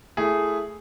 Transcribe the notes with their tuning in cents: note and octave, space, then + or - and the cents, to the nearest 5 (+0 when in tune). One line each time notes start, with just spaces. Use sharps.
A3 +0 E4 +10 G#4 +0